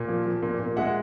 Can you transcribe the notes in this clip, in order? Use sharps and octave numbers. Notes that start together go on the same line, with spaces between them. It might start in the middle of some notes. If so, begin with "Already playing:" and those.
Already playing: A#2
F3
F3
A#2
A#2
G#3 E5 F#5